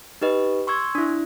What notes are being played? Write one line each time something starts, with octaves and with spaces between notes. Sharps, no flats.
D#4 G4 B4 D#5
C6 C#6 E6 G#6
D4 E4